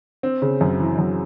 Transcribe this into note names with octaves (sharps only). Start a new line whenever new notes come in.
C4
C#3
F#2
E3
F#2